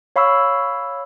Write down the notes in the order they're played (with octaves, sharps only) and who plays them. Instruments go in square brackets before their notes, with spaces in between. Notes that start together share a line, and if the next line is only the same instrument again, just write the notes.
[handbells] C#5 F5 B5 C#6 E6